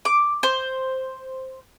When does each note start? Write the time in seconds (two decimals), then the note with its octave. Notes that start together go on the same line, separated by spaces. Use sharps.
0.05 D6
0.43 C5